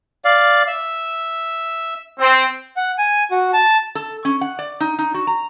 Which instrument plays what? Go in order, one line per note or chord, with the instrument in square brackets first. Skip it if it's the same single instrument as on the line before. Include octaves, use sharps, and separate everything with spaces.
[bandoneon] D5 F5
E5
[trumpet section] C4
[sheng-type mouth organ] F#5
G#5
F#4
A5
[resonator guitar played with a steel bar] A4
C#4
F#5
D5
D#4
D#4
F#4
A#5